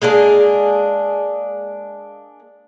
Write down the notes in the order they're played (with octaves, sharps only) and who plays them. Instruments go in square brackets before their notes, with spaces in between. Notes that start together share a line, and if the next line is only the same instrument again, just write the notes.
[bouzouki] G#3 A#3 D4 G#4